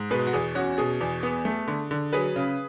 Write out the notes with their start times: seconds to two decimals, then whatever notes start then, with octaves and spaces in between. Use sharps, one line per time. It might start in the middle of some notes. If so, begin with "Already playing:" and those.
Already playing: G#2
0.11 B2 G#4 B4
0.27 F#4
0.33 E2 G#4
0.55 C#4 F#4
0.78 B2 G#4
1.01 E2
1.23 B3
1.45 A3
1.68 D3
1.91 D3
2.13 F#3 G#4 B4
2.36 C#3